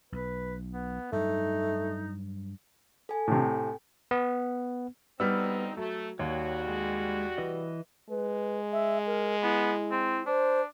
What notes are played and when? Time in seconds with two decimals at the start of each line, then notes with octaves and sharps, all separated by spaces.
0.12 B1 B4
0.72 B3
1.12 G2 F#3 A3 D#4
3.09 A4 G#5
3.28 A2 C3
4.11 B3
5.20 D2 G3 B3 C4 D#4 E6
5.77 F#3 A3
6.19 D#2 G3 F#4 C#5
6.68 G#3
7.38 E3 B4 D#5
8.10 G#3 B4
8.72 E5
9.07 A#4
9.43 B3 E4
9.91 C4
10.26 D4 C5